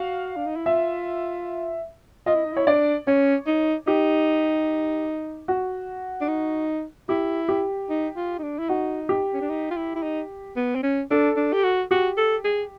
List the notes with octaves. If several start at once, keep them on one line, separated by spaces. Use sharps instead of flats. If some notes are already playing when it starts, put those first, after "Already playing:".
Already playing: F#4 F5
D4
D#4
E4
F4 E5
F4 D#5
E4
D#4
E4 C#5
D4 D5
C#4 C#5
D#4
D#4 G4
F#4
D4
D#4
E4 G4
G4
D#4
F4
D#4
D4
E4
D#4 F#4
G4
C#4
D4
D#4
F4
E4
E4
D#4
B3
C4
C#4
D4 A4
D4
G4
F#4
F#4 G4
A4
G#4